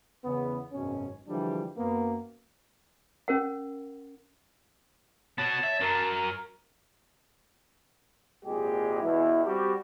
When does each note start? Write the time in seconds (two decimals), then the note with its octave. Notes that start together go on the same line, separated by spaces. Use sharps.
0.24 E2 C#3 B3
0.73 G#1 F#2 B2 C#4
1.28 D3 E3 F3 G3 G#3 D4
1.77 F#2 A#3 B3
3.28 C#4 A#4 F#5
5.38 B3 F#4 C#5 A5
5.63 E5
5.80 F#2 F#3 A#4
8.45 G#1 A#2 G#3 G4 G#4
9.01 E2 B2 E3 E4
9.45 G3 C4 F#4 G4